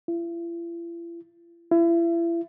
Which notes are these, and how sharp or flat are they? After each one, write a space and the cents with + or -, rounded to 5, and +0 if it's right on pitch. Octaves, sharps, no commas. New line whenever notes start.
E4 +45
E4 +35